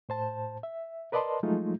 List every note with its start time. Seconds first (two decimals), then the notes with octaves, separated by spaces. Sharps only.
0.09 A2 C5 A5
0.63 E5
1.12 A#4 B4 D5 D#5 A5 C6
1.43 F3 F#3 G#3 A3 D#4 F4